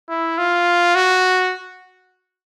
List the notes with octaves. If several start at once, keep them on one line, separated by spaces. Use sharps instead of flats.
E4
F4
F#4